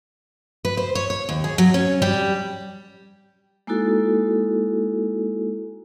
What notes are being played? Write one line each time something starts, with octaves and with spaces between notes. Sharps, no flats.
B4
C5
C#5
C#5
D#2
G#4
F#3
C#4
G3
G#3 A#3 D#4 E4 F#4 A4